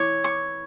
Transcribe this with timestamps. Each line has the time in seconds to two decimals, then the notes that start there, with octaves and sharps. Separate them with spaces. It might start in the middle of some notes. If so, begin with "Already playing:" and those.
Already playing: E3 E4 C#5
0.24 C#6